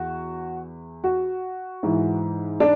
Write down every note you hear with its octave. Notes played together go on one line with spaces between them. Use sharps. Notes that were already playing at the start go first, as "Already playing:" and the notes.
Already playing: E2 F#4
F#4
G#2 E3
D4